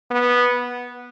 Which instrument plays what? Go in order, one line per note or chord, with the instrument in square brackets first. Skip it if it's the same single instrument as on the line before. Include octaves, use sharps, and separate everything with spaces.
[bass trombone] B3